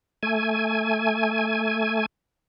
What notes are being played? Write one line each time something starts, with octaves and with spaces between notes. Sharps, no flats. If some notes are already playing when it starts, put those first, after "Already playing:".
A3 G#5